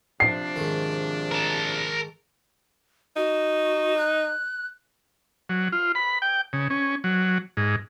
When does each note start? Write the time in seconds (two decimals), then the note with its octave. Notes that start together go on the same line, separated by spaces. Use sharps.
0.20 C3 F3 D4 C7
0.56 G#2 D#3
1.31 A#4 A5
3.17 D#4 F#4
3.98 F#6
5.49 F#3
5.72 F4
5.95 B5
6.22 G5
6.53 C#3
6.70 C#4
7.04 F#3
7.57 G#2